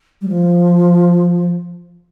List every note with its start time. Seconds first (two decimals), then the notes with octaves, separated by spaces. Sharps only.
0.21 G3
0.28 F3